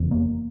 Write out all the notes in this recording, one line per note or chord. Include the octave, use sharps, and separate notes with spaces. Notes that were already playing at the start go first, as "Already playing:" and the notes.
Already playing: F1 E2 C#3
A#3